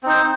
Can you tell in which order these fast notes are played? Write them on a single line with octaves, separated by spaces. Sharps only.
C4 D#4 C5